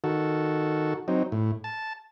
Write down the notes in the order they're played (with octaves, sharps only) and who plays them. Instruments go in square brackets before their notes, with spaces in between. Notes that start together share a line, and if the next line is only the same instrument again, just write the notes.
[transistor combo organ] D#3 F#4 A4
F#3 C4 D#4
A2
A5